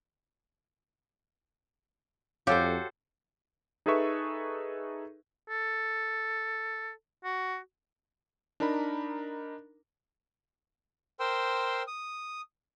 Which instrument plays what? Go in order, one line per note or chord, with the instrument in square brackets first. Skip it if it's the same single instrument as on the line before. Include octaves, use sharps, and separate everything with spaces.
[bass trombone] F2 [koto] F#4 A4 C5 [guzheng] G4 [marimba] C#5 F5
[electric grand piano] D#4 G#4 A4 B4 E5 C#6
[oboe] A4
F#4
[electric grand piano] D4 D#4 A#4 A#5 B5
[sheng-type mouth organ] A#4 C5 G5 C6 E6
D#6